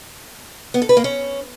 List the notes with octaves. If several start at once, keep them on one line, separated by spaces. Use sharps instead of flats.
B3
A4
B4
A#3
C#4